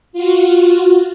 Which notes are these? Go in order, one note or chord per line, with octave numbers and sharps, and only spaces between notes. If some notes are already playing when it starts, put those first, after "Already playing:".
F4 F#4